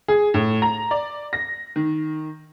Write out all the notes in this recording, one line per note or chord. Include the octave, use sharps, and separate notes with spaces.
G#4
A2
A#5
D5
A#6
D#3